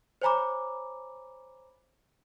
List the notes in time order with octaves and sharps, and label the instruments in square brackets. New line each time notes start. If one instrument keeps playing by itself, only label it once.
[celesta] C5 C#5 G#5 A#5 B5 D6